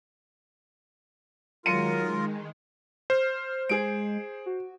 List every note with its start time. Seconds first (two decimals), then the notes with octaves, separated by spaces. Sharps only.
1.66 D#3 F#3 G#3 F4 A#4 C#7 D#7
3.10 C5 F6
3.69 G#3 G#4 D7
4.46 F#4